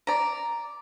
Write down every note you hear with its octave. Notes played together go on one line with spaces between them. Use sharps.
D5 A#5